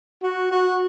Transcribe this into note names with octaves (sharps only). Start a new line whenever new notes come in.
F#4
F#4